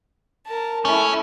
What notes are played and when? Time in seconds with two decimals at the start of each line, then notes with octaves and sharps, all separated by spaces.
0.47 A#4 A5
0.85 A3 C#4 E4